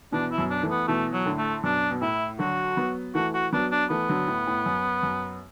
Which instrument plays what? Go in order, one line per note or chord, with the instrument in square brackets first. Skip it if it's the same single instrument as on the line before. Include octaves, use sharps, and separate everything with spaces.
[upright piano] B2 E3 [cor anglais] D4
[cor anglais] E4
[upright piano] F#2 B2
[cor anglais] D4
[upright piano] E3 A3
[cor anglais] B3
[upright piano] B2 E3 [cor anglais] A3
[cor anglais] F#3
[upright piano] A2 D3
[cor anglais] A3
[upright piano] F#2 B2 [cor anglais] D4
[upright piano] B2
[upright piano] A2 [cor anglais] E4
[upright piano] D3 F#3 [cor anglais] F#4
[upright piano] F#3 B3
[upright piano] E3 A3 [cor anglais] F#4
[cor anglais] F#4
[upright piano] F#3 B3 [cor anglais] D4
[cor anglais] D4
[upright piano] E3 A3 [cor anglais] B3
[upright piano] D3 F#3
A2
A2
F#2
F#2